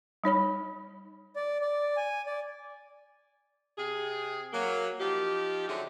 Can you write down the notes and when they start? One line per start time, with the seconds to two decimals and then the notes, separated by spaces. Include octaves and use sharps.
0.24 G3 D#4 C#5 B5
1.36 D5
1.61 D5
1.97 G#5
2.26 D5
3.78 C3 G#4
4.53 F#3 A#3
5.00 F3 D#4 G4
5.68 D3 F#3 C4 E4 G#4